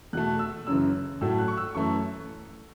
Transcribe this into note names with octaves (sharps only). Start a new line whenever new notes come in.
E2 B2 A3 F#6
E6
F#2 C#3 E3 E6
A2 F#3 A3 E6
F#6
C#6
E6
F#2 E3 A3 C#6